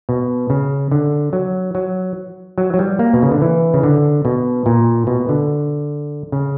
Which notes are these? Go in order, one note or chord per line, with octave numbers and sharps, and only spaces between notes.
B2
C#3
D3
F#3
F#3
F#3
F#3
G3
A#3
B2
C#3
D3
E3
C#3
D3
B2
A#2
B2
D3
C#3